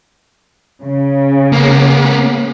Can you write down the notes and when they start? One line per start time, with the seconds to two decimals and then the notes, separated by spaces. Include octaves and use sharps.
0.83 C#3
1.52 A#3 B3